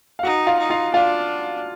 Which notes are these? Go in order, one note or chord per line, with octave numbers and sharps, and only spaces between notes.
F5
D#4 F#4 F#5
F4 F5
D#4
F4 F5
D4 F4 F5